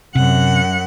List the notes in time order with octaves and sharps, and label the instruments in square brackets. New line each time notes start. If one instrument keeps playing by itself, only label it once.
[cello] F#2 F#5 [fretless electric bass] C3